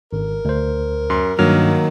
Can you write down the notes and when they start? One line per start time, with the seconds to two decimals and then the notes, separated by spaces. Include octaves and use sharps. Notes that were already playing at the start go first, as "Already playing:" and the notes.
0.13 G#1 A#4
0.45 D2 C5
1.10 F#2 C6
1.39 G2 D#3 F#3 A#3 F6